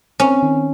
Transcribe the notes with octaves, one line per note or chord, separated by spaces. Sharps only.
C4 C#4
D#3